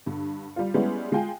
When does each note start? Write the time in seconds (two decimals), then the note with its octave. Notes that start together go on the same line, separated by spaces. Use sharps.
0.06 G2 D3
0.56 G3 F4
0.74 G3 G#3 B3 C#4 E4
1.12 G#3 F4 G5 G#5